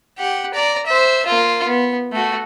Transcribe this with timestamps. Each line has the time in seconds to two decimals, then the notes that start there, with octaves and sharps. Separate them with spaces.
0.18 G4 F#5
0.54 D5 A#5
0.87 C5 E5
1.26 A#3 F4
1.67 B3
2.12 A3 F#4